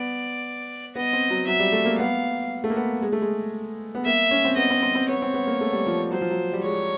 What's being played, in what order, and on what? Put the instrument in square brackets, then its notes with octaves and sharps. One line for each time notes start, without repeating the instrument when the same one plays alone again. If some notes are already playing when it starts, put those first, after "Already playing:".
Already playing: [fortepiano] B3 [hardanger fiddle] D5
[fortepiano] B3 [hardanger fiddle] D#5
[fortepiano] C4
F#3
[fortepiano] F#3 [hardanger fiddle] E5
[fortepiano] G3
A3
A#3
[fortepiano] B3 [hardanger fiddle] F5
[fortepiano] A3
A#3
B3
G#3
A3
G#3
B3
[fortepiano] A#3 [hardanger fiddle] E5
[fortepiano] C#4
C4
[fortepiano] B3 [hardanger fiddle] D#5
[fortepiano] C4
C4
C4
[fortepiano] B3 [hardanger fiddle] C#5
[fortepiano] C4
B3
A#3
A3
G3
F3
[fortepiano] F#3 [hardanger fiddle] C5
[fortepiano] F3
F#3
G3
[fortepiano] G#3 [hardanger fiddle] C#5